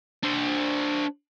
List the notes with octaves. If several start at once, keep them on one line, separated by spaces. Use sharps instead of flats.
D4 C5